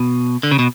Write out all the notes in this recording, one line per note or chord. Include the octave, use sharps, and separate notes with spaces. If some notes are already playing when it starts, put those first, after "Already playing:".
Already playing: B2
D3
C#3
B2